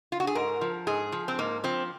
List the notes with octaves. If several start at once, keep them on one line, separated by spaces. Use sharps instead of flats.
F4
F#4
G#4
G#2 A#4
F3
G#2 G#4
F3
C4
G#2 A#3
F3 C4